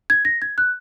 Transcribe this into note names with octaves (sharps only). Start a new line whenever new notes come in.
G#6
A#6
G#6
F#6